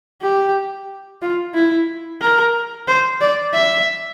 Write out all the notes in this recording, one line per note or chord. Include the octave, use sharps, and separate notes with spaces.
G4
F4
E4
A#4
C5
D5
E5